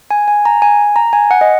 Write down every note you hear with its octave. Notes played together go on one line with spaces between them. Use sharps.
G#5
G#5
A#5
G#5
A#5
G#5
F#5
D#5